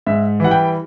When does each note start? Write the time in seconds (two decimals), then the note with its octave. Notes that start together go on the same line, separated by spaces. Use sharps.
0.06 G#2 E5
0.40 E3 G3 F#5
0.51 G5